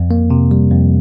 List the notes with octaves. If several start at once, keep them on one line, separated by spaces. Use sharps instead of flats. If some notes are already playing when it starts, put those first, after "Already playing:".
Already playing: F2
A#3
C3
G3
F2